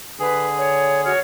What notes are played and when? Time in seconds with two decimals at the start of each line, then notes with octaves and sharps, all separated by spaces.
0.20 D3 G#4 B4
0.59 C#5
1.04 F#4 C#5 F6